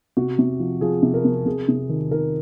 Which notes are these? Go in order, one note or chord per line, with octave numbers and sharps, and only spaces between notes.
C3 F#4
C3
F3
F3 G#4
C3
A#4
C3
C3 G#4
C3
D#3
D#3 A#4